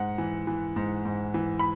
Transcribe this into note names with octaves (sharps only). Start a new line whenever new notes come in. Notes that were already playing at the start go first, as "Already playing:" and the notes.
Already playing: G#2 F#5
E3
E3
G#2
G#2
E3
B5